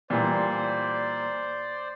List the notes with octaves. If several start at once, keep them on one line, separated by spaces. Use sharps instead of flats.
A#2 E3 G3 C5 D5